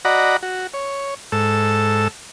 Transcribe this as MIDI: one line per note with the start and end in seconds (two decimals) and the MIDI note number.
0.05 0.37 66
0.05 0.37 74
0.05 0.37 75
0.05 0.37 78
0.05 0.37 82
0.05 0.37 83
0.43 0.67 66
0.74 1.14 73
1.32 2.08 44
1.32 2.08 69
1.32 2.08 88